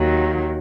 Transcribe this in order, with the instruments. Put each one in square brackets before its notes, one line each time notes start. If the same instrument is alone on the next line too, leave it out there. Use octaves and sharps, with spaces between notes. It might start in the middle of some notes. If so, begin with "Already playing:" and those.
Already playing: [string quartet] D#2 D#3 F#3